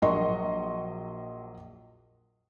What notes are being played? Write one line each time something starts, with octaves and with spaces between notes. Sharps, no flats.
A#1 F#3 A#4 D#5 C6 C#6